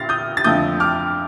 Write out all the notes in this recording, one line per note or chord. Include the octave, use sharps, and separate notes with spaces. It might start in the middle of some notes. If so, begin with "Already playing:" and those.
Already playing: A#2 F6 A6 A#6 C7
D#6 G6
A6
F2 D3 F3 A3 D#6 G6
D6 F6